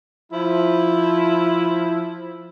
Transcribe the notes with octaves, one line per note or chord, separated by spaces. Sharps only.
F3 E4